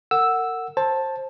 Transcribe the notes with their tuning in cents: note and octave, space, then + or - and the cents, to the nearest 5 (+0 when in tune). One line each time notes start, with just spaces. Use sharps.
A#4 -35 F#5 +0 E6 +0
C5 +20 A5 +0